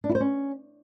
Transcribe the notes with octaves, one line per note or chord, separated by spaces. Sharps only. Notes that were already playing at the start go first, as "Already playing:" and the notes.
D4
E4
C5
C#4